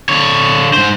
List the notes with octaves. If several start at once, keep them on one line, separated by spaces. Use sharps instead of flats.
D3 C#5
G#2 C5